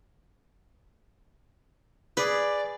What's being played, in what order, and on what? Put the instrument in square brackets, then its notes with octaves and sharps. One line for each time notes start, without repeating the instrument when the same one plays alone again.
[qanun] G#4 [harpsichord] B4 [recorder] D5